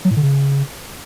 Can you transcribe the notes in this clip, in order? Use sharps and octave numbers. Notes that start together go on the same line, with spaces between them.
F#3
A2
D3
C#3